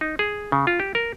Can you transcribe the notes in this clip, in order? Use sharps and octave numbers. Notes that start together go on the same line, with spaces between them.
D#4
G#4
C#3
F4
G4
A#4